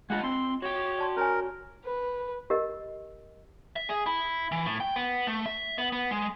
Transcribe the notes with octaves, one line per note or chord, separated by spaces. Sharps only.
G#3 D4 F4 D#5 F5 F#5 A5
C4 C6
F#4 C#5 G5
D5 A5 C6
C#4 A#4 C#5 G#5
B4
G4 A#4 D#5
E5
G#4
E4
E3
A2
G5
B3
A3
E5
B3
B3
G#3